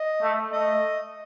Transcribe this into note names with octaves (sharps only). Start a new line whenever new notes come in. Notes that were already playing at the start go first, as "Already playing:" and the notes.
Already playing: D#5
A3
A3 D#5